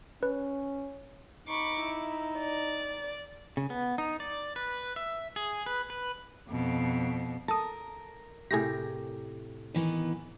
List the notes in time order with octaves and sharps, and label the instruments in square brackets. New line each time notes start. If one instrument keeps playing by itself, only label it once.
[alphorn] C#4 [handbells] B4
[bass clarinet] D#4 [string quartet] B5 C#6 D6
[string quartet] E4
D5
[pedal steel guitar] C#3
B3
D#4
D5
B4
E5
G#4
B4
B4
[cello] F2 B2
[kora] A4 [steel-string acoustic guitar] A#4 [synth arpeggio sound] A5 D#6
[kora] A2 C3 G4 [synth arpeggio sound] G#4 A#6
[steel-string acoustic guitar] D#3 E3 B3